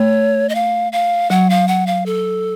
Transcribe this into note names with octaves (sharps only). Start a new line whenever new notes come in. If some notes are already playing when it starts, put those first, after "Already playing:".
Already playing: A3 C#5
D#5
F5
F5
F#3 F#5
F5
F#5
F5
A4